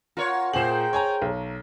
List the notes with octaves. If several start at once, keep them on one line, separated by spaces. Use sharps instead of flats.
F4 A#4 C#5 F#5
A#2 G#4 C5 G5 F#7
C#5 G#5 A#5
B1